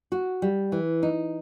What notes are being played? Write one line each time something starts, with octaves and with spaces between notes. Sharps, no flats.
F#4
G3
E3
D#4